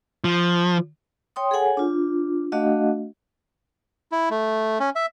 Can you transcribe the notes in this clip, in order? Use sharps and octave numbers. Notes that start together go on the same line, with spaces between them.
F3
C#5 G5 C6 D#6
G#4 A4 C#5 F#5 G#5
D4 F4
A3 D4 F#4 D#5 F5 F#5
E4
A3
C#4
E5